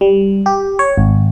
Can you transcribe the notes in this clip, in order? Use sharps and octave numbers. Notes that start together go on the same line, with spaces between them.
G3
G4
C#5
G#1